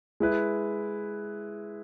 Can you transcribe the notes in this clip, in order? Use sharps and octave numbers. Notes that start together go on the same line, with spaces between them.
G#3 E4 B4